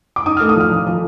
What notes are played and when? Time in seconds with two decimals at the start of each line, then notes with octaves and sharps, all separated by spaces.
0.16 D6
0.26 D#4 D#6
0.37 A3 F6
0.49 D#6
0.56 F3 F6
0.72 F3
0.87 F3